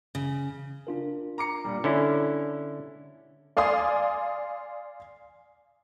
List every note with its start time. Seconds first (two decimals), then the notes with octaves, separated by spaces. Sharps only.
0.15 C#3
0.87 D4 F4 A#4
1.38 A#5 D6 C#7
1.64 A#2 G3
1.84 D3 C#4 E4
3.57 D5 F5 G#5 C6 D#6